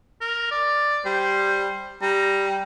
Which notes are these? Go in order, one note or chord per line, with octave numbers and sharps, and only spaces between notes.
A#4
D5
G3 C5
G3 A#5